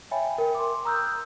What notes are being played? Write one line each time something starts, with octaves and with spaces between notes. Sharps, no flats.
C#5 E5 G5 G#5 B5
A#4 G5
C6 D6
A#5 D#6 E6 F#6 G6